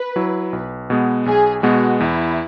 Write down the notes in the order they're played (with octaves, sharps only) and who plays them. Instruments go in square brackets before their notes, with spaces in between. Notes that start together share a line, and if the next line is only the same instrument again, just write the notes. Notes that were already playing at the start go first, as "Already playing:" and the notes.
Already playing: [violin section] B4
[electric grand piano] F#3 E4
B1
B2 G#3 B3
[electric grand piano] B1 [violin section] G#4
[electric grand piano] B2 G#3 B3 [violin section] F#4
[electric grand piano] E2 [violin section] E4